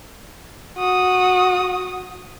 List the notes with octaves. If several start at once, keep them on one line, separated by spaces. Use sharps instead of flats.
F#4 D#6